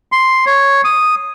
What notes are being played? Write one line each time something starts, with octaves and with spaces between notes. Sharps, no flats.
C6
C#5
D#6